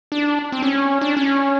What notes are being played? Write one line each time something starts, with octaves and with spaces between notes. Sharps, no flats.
D4
C4
C#4
D4
C#4